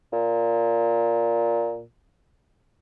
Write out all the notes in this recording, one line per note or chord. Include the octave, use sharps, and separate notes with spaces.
A#2